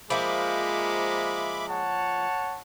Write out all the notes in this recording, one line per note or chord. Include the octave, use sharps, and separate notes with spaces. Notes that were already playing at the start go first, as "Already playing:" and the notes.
F3 G#3 A#3 E5 B5 D6
C#5 F#5 A5